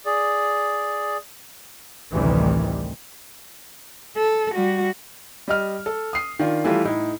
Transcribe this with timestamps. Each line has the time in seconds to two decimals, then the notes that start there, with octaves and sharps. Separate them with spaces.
0.06 G#4 D5
2.12 A1 D2 C3 D#3 E3 G3
4.16 A4
4.54 G3 F#4
5.48 G3 D#5 F6
5.86 A4
6.13 D#6 C7
6.39 D#3 D4 F4
6.64 E3 G3 A3 F4
6.85 A2 D#4 E4